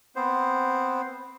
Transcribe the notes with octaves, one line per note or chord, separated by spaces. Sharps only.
B3 C4 C5